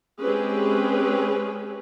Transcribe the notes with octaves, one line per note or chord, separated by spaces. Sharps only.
G#3 C4 C#4 G4 G#4 B4